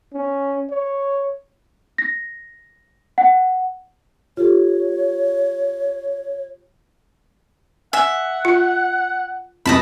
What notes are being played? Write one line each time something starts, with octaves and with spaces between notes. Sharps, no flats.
C#4
C#5
A#6
F#5
F4 G4 A4 C#5
E5 F#5 G#5
F4
F1 C2 F#2 D#5 A5 B5